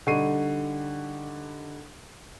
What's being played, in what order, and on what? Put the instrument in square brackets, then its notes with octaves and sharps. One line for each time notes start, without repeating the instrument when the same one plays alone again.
[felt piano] D3 G3 D#4 C#6 C7 D#7